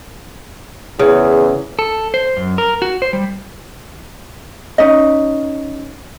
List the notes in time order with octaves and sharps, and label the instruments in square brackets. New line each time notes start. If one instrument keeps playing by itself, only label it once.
[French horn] E2 [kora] C#3
[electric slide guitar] A4
C5
F#2
A#4
F#4
C5
G3
[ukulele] C#4 D#4 D#5